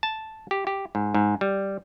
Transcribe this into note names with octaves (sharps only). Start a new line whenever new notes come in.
A5
G4
G4
G#2
G#2
G3